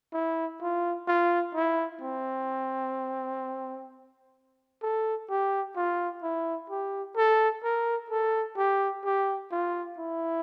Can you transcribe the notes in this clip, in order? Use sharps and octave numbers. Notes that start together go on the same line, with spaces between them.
E4
F4
F4
E4
C4
A4
G4
F4
E4
G4
A4
A#4
A4
G4
G4
F4
E4